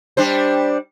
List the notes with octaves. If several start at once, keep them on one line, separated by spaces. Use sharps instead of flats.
G3 D4 C5